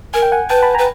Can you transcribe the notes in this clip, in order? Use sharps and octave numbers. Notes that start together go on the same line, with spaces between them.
A#4 G#5
G5
F#5 G#5
B4 G5 A5
A5 B5
B4 G#5 A#5